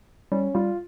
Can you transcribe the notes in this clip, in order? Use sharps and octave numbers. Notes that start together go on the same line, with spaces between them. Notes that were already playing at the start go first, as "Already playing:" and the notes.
G3 C#4
G3 F4